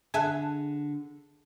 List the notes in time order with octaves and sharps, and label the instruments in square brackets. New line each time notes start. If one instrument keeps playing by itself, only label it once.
[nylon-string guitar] D3 [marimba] G#4 A5 F#6 [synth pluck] E5 G#5